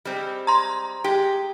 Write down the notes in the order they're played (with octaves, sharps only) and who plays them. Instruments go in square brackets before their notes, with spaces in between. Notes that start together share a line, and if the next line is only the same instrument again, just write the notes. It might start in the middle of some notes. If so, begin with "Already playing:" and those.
[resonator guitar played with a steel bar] G3 G#3 C4
[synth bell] A#5 C6
[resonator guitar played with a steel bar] G#3 G4